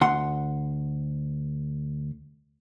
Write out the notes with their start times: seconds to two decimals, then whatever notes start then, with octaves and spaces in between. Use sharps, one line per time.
0.01 D2 F#5 C6